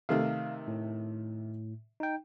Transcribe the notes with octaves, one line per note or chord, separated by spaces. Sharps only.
C3 D#3 A3 F5
A2
D#4 G5